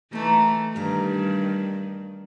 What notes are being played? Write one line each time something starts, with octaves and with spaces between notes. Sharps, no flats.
E3 A3 D#4 A#4
G2 D#3 A#4 F5